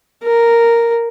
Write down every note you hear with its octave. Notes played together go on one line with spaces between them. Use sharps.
A#4